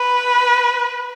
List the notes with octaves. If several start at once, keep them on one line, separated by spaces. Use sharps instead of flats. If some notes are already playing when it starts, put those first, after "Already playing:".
Already playing: B4